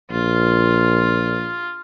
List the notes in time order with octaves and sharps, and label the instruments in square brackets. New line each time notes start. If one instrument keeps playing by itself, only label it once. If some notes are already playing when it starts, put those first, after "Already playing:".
[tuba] A#1 [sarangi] F4